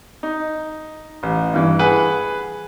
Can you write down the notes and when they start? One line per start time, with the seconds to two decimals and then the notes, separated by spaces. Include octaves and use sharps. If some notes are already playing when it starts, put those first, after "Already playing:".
0.23 D#4
1.23 A1
1.54 G2 E3
1.79 G#4 B4 F#5